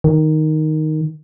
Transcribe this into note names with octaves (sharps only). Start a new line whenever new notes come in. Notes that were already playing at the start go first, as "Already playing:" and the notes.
D#3